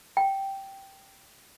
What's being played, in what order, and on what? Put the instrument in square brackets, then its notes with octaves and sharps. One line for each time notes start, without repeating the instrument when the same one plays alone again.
[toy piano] G5